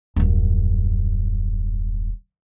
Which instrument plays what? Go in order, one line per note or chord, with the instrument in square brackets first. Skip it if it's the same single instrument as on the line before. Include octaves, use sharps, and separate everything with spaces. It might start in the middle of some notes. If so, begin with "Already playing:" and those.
[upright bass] D#1 F#2